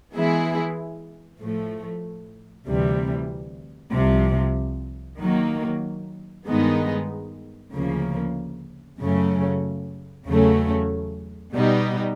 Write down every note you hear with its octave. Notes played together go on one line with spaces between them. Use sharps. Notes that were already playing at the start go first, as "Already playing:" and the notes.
E3 G#3 B3 E4 G#4
A2 F3 A3
D2 C3 E3 G3
C2 C3 F3
D#3 F#3 A#3
G2 D#3 G#3 B3 D#4
D2 C#3 F3 A#3
F#2 C#3 F#3 A3 C#4
E2 C#3 F#3 A3 C#4
B2 G3 B3 D#4